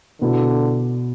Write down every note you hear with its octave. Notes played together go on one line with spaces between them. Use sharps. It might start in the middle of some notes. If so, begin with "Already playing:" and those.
B2 D3 B3 E4